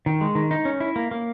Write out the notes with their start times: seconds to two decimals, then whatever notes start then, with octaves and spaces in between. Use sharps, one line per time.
0.06 D#3
0.21 G#3
0.35 D#3
0.51 D#4
0.65 C#4
0.80 E4
0.96 A#3
1.11 A#3